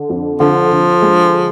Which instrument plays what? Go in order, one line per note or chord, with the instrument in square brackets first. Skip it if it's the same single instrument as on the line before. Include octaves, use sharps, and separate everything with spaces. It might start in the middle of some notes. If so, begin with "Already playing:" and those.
Already playing: [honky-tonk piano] D3
F2
[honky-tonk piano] D3 [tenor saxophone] F3
[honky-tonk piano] D3
G#3